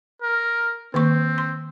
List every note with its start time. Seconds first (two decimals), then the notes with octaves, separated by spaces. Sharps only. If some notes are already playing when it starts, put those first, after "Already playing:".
0.22 A#4
0.94 D#3 A#3 C4 C#6
1.38 C6